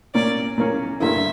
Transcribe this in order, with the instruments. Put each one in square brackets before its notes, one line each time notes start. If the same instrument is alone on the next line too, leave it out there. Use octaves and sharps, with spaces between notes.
[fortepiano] A#2 A#3 C#4 [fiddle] D5
[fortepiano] A#2 A#3 C#4
[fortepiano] G2 D3 A#3 E4 [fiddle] E5